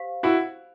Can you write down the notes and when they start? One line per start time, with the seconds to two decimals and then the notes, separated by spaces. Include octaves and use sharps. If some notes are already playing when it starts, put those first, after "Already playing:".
Already playing: G4 C5 F5
0.23 E4 F#4